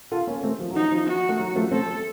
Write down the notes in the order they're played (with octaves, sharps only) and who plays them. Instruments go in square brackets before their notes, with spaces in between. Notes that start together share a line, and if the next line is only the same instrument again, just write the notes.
[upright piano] F4 A4
A#3 C#4
A3 C4
F3
F#3
[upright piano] F3 [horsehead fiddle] D#4
[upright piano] F3
[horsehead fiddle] F#4
[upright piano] A3
F#3
F3 A3
[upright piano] A3 C4 [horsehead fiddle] A4